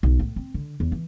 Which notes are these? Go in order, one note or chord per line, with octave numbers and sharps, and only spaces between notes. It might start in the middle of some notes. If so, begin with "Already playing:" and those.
B1
A2
C4
D3
E2
E3